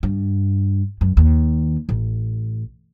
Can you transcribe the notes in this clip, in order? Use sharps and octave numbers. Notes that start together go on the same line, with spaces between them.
G2
F#2
D#2
A1